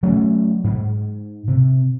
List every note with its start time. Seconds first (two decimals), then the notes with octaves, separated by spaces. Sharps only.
0.03 F#3 A3 C#4
0.64 G#2
1.48 C3